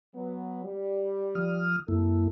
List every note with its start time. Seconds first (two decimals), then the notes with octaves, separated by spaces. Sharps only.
0.15 F#3 B3
0.64 G3
1.35 F3 D#6 F6
1.88 F#2 C3 A#3 E4 A4